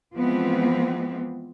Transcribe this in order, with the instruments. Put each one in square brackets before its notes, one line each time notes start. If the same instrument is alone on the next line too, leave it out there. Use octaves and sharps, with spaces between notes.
[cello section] E3 F3 G#3 B3 C4